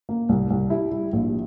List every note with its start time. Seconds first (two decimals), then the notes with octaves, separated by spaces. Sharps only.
0.09 A#3
0.29 C2
0.50 C2
0.70 G3 E4
0.91 G3
1.13 A#1